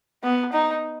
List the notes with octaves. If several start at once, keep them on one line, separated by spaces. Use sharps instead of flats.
B3
D#4